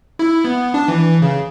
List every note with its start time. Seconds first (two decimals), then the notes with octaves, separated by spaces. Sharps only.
0.19 E4
0.45 B3
0.74 D4
0.88 E3
1.22 C#3